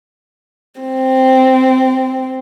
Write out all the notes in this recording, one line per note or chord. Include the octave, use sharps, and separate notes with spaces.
C4